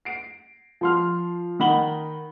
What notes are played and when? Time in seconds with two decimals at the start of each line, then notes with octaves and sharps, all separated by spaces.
0.05 C7 D7
0.81 F3 C6 F6
1.60 D#3 D#4 F#5 B5 F#7 G7